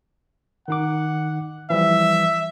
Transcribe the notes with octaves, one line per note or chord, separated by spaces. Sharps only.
D#3 D#4 F#5 D6
E3 F3 G3 E5